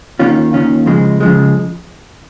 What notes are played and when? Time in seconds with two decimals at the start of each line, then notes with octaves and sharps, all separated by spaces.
0.19 D#2 D#3 C#4 F4
0.53 D#2 D#3 C#4 F4
0.86 C#3 F3 G#3
1.20 C#3 F3 G#3